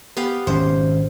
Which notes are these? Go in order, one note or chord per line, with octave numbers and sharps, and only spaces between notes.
B3 G4 F5
G#1 B2 C#4 C5